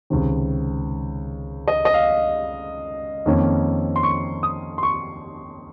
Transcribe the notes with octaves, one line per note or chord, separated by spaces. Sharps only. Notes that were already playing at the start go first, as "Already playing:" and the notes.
C#2 C3 D#3
D#5
D#5
F5
F2 D#3 A#3 C#4
C6
C#6
D#6
C6
C#6